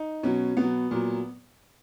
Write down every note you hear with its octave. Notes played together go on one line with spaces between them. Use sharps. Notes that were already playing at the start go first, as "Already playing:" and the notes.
Already playing: D#4
B2 F#3 C#4
B2 F#3 B3
A#2 F#3